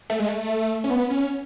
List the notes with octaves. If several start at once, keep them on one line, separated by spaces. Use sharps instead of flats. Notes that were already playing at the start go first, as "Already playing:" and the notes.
A3
G#3
A3
C#4
B3
C#4